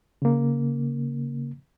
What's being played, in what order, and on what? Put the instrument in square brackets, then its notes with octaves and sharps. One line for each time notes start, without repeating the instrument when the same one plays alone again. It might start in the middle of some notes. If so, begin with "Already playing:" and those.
[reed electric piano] C#3 A#3